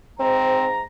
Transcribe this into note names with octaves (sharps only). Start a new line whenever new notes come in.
G#2 C4 A#5